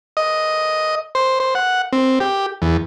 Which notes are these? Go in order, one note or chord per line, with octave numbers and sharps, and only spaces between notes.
D#5
C5
C5
F#5
C4
G4
E2